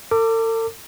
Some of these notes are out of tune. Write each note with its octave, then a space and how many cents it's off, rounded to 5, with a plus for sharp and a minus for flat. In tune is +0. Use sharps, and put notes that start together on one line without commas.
A4 +45 D6 +0